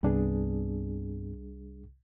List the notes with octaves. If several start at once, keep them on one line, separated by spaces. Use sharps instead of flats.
C2 G2 C3 G3 B3 D4 G#4